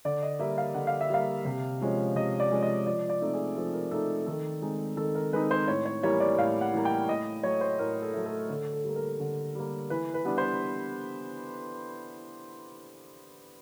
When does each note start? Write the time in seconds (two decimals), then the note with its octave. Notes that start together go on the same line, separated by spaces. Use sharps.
0.05 D3 D5
0.23 D#5
0.39 G3 A#3 E5
0.58 F5
0.74 D3 F#5
0.87 F5
1.01 E5
1.10 G3 A#3 F5
1.45 C3
1.81 F3 G#3 C#4
2.15 C3 D#5
2.40 D5
2.50 F3 G#3 C#4
2.62 D#5
2.86 F3 D5
3.09 D5
3.21 A3 C4 D#4
3.34 G#4
3.57 F3 A4
3.74 A#4
3.91 A3 C4 D#4 A4
4.26 D#3 A4
4.62 G#3 C4 D#4
4.97 D#3 A4
5.15 A#4
5.33 G#3 C4 D#4 B4
5.51 C5
5.68 A2 C#5
5.85 C#5
6.03 E3 G3 A#3 C#5
6.20 D5
6.38 A2 F5
6.61 F#5
6.73 E3 G3 A#3
6.85 G5
7.09 A2 D#5
7.43 F#3 A3 C#5
7.61 C5
7.79 A2 A#4
8.02 A4
8.14 F#3 A3
8.26 A4
8.49 D3 A4
8.73 A4
8.84 G3 A#3
8.96 A#4
9.20 D3
9.55 G3 A#3
9.90 E3 B4
10.14 B4
10.25 G3 B3 D4
10.38 C5